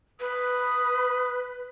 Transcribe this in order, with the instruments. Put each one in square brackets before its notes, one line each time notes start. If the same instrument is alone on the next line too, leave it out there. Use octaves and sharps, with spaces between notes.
[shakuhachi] B4 [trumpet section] D#6